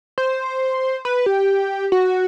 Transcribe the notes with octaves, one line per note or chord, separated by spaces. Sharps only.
C5
B4
G4
F#4